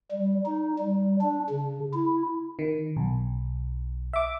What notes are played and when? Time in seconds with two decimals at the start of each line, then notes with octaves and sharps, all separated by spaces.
0.12 G3
0.46 D#4
0.79 G3
1.21 D4
1.50 C#3
1.94 E4
2.59 D#3
2.97 B1
4.13 E5 D6